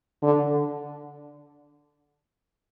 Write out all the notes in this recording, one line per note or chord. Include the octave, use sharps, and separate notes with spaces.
D3